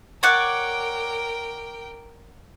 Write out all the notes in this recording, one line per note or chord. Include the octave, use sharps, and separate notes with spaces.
A#4 C#5 D5 F#5 G5